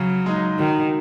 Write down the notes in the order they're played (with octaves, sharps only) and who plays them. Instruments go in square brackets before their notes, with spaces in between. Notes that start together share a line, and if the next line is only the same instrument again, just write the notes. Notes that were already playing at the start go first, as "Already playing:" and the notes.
Already playing: [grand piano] C#3 [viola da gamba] F#3
[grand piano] G#3 D#4
[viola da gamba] D#3 [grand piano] F#3